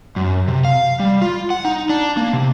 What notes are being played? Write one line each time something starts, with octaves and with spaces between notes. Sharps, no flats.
F#2
C3
F5
G3
F4
F#5
D#4
D4
A#3
C3